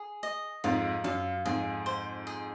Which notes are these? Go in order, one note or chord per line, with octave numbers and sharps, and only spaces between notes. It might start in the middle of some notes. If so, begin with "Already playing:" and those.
Already playing: G#4
D#5
F2 G#2 F4
F#2 F5
F2 G#2 G#4
C5
G#4